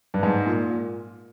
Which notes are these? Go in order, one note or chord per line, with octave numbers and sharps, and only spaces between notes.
G2
G#2
A#2